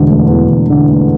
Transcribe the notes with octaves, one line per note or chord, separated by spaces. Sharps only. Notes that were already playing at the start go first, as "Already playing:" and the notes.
Already playing: E1 E2 D3
A3
E2
E1
D3
A3